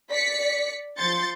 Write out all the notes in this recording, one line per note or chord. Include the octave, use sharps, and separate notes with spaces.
D5 B6 C#7
F3 C6 G6 A6 C#7